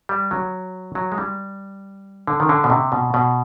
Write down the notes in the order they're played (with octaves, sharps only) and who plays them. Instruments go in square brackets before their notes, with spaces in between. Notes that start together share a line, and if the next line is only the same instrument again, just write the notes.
[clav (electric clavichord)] G3
F#3
F#3
G#3
G3
D3
D#3
D3
B2
C3
B2
B2